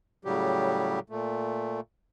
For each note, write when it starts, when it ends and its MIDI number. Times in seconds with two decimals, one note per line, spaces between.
0.25 0.99 45
0.25 0.99 49
0.25 0.99 54
0.25 0.99 55
0.25 0.99 67
1.10 1.80 46
1.10 1.80 57